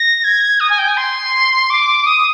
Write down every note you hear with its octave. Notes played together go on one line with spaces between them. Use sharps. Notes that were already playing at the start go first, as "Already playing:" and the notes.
Already playing: A#6
G#6
D#6
G#5
G5
G#5
C6
D6
D#6